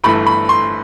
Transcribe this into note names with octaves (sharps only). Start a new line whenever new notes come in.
G1 G2 E3 A3 B5
B5
C6